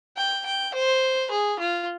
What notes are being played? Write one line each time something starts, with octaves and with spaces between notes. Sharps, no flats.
G5
G5
C5
G#4
F4